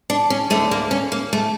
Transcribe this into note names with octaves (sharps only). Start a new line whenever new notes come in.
D4
C#4
D2 D3 A3
A#3
C#4
A#3
A3